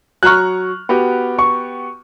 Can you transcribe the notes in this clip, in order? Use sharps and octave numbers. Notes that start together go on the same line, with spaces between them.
F#3 A#5 C#6 F6 F#6
B3 F#4 G4
C#6